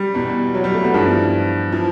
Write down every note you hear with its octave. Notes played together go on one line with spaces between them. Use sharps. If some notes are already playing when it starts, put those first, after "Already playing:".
Already playing: G3
E2 B2
F#3
G3
A3
B3
G2 E3 F3
E3 F3